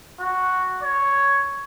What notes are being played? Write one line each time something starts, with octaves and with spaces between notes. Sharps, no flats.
F#4
C#5